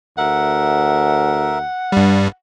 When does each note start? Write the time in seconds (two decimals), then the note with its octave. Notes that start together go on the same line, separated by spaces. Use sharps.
0.18 D2 A#4 E5 F#5
1.92 G2 G3